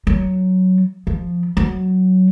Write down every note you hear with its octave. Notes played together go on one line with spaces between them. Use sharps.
F#3
F3
F#3